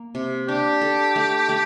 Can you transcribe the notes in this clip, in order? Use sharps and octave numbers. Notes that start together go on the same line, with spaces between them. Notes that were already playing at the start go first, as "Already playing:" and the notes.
Already playing: A#3
C3
D4 G4
A4
A3
A3